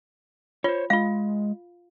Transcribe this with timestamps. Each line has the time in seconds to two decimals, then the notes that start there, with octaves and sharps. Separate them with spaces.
0.64 F4 C5 C#5
0.90 G#3 F4 F5